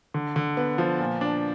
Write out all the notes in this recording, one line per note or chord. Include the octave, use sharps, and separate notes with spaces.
D3
D3
B3
F3
A#2
D4